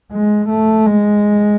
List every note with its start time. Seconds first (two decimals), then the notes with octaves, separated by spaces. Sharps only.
0.12 G#3
0.49 A3
0.87 G#3